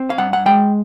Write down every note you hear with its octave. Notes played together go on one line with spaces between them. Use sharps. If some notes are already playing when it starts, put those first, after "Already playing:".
Already playing: C4
F5
G2 F#5
F#5
G#3 G5